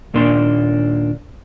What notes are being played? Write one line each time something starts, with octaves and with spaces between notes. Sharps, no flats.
D#2 A#2 A#3 D4 C6